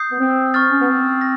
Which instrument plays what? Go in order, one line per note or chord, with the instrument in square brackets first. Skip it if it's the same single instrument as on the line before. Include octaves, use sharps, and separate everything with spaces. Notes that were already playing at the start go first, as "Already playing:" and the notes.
Already playing: [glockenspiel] D#6 G6 C7
[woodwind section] B3
C4
[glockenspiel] C#6 F6 A6
[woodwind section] C#4
B3
C4
[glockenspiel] A#6